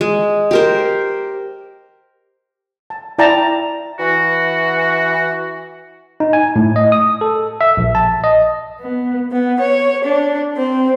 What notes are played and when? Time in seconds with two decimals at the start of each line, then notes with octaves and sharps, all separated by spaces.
0.01 G#3
0.51 G4 A#4 C5
2.90 A5
3.19 E4 D5 G5 A5 A#5
3.99 E3 F#4
6.20 D#4
6.33 G#5
6.56 A2
6.76 D#5
6.92 D#6
7.21 A4
7.61 E5
7.77 A#1
7.95 A5
8.24 D#5
8.80 B3
9.31 B3
9.60 C#5
10.05 D4
10.56 C4